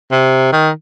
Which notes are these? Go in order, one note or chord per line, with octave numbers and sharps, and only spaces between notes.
C3
D#3